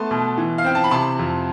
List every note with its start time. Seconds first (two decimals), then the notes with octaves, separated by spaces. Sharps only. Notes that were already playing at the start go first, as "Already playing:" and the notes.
Already playing: A3 B3 A5 C6
0.11 B2
0.37 E3
0.58 F5
0.64 C4 G5
0.75 A5
0.84 B5
0.91 C3 A5 C6
1.19 F2